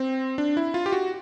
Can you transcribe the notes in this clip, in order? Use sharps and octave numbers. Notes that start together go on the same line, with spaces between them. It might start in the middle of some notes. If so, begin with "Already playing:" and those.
Already playing: C4
D4
E4
F4
G4
F#4